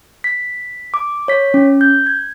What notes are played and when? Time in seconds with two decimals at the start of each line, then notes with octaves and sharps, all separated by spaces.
0.24 B6
0.94 D6
1.28 C#5 B6
1.54 C#4
1.81 G6
2.07 G#6